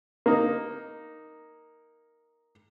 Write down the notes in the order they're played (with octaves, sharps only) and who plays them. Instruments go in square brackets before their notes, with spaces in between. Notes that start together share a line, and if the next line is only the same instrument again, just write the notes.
[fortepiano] A#3 D#4